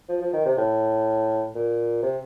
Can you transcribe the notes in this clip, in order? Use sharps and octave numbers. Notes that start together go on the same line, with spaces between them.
F3
F3
D#3
C3
A2
A#2
C3